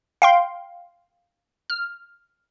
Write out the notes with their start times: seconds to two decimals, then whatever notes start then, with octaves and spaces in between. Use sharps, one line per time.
0.22 F5 G5 C6
1.70 F6